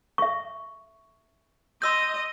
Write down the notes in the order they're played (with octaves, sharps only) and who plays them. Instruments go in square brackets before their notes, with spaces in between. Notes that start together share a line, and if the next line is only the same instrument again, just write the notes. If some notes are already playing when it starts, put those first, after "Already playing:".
[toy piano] E5 C#6
[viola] D#5 [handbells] C6 E6 G6